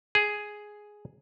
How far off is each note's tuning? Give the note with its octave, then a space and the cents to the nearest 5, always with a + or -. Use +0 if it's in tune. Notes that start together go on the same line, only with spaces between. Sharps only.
G#4 +5